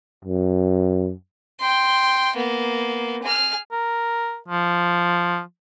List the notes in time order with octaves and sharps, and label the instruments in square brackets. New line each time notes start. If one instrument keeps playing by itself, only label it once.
[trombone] F#2
[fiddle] G5 C6
A#3 B3
G#4 F6
[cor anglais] A#4
F3